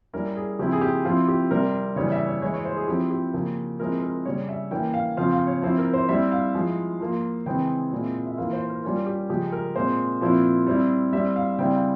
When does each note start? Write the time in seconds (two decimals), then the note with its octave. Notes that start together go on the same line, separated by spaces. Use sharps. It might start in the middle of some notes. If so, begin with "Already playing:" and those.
0.13 G3 C#4 E4 A#4
0.37 G#4
0.59 C#3 F3 C4 E4 G4
0.72 G#4
0.81 G4
1.05 F3 C4 E4 F4
1.28 G4
1.51 C3 G3 C4 A#4
1.96 C#3 E3 G3 C#5
2.12 E5
2.27 C#5
2.42 E3 G#3 E4 C#5
2.54 C#5
2.65 C5
2.76 G#4
2.88 F3 C4 E4 G4
3.11 G4
3.33 C#3 F3 A#3
3.80 F3 G#3 C4 E4 A#4
4.02 A#4
4.25 C#3 G3 C#4 C#5
4.49 E5
4.71 E3 A#3 C#4 G5
4.94 F5
5.17 C#3 F3 C4 F4 F5
5.32 F5
5.47 C#5
5.62 F3 C4 E4 C5
5.78 A#4
5.94 C5
6.09 G3 C4 E4 E5
6.32 F5
6.55 F3 G#3 E4
7.00 F3 A#3 F4
7.46 C#3 E3 G#3 C4 E4 G5
7.92 A#2 G#3 C4 E4
8.26 E5
8.37 E3 A#3 F4 F5
8.53 C5
8.69 A#4
8.84 G3 C#4 F4 A#4
9.07 G4
9.29 C#3 F3 G#3 G4
9.52 A#4
9.76 A#2 G#3 C4 C5
10.21 A#2 F3 C4 E4
10.67 G3 C4 E4
11.13 G3 C4 E4 E5
11.36 F5
11.58 C#3 G3 C4 E4 G5
11.74 F5